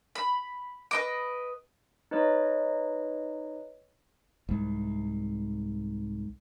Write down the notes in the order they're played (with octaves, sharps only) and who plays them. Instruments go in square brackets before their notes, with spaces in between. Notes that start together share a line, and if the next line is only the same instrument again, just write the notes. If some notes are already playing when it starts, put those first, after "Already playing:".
[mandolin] B5
B4 D#5 D6
[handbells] D#4 B4 C#5 D#5
[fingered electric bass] C2 G#2